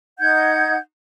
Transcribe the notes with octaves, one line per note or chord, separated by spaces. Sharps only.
D#4 F#5 G6 G#6